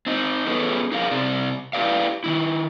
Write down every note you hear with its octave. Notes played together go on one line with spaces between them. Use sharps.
C4 D#4
B3 C#4 G#4 A4 B4
D#4 G#4 A#4 F5
C3 C4 D5
E4 G4 G#4 B4 D5 F5
D#3 E3 E4